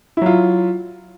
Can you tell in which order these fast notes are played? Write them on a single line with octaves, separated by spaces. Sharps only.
E4 F#3 F4